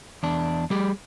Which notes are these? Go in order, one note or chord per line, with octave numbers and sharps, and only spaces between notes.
E2 D4
G3 G4 G#4